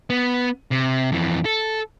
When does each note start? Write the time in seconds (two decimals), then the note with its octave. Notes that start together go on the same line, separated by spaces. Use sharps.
0.10 B3
0.71 C3
1.12 F2 E3
1.45 A4